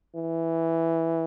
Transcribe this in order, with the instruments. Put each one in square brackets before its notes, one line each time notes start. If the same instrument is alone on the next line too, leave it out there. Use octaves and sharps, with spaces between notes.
[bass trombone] E3